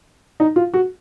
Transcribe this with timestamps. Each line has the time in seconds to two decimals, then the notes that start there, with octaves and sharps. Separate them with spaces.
0.40 D#4
0.56 F4
0.74 F#4